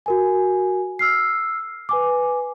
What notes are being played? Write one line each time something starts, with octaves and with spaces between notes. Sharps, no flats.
F#4 A#4 G#5
E6 F6 C7
B4 G#5 D6